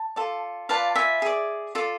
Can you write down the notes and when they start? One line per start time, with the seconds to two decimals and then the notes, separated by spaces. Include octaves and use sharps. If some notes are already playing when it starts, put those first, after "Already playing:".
Already playing: A5
0.16 F4 A4 D5
0.69 F4 B4 D5 F5 A5
0.95 E5 G#5
1.22 G#4 D5
1.75 F4 A4 D5